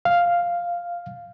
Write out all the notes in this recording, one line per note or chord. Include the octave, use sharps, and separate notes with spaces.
F5